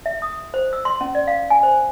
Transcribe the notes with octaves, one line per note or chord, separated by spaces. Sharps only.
E5
D#6
C5
E6
C6
C#4
D5
F5
G#5
C5